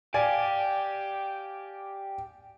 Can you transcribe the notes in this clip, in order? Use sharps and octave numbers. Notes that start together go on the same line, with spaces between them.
G4 D5 F5 G#5